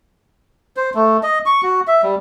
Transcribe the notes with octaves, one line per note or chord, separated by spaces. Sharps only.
C5
A3
D#5
C#6
F#4
E5
G3